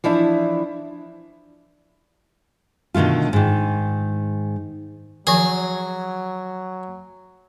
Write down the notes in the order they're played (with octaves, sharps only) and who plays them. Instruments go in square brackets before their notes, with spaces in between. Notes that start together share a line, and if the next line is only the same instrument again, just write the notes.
[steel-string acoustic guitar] E3 F3 D4 E4
[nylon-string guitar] B2 D3 D#3 A3 F4
G#2 D#3
[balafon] D#3 F3 [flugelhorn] F#3 [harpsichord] G#4